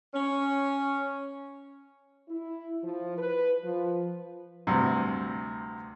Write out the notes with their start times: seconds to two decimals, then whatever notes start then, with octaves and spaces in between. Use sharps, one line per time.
0.13 C#4
2.29 E4
2.84 F3
3.18 B4
3.64 F3
4.67 D2 G2 C3